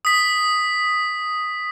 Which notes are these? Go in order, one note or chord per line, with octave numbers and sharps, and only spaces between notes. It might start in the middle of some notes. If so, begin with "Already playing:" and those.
D#6 B6